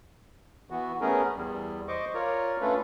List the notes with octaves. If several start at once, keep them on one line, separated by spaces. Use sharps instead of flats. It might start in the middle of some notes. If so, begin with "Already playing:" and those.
E3 B3 F#4
A3 B3 C#4 G#4 A#4
E2 G3
C5 D#5 C#6 D6
F4 A#4 C#5 D5
A3 C#4 D4 F4 A4 B4